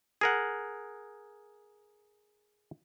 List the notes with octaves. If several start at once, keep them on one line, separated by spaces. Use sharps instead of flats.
G#4 A#4 F#5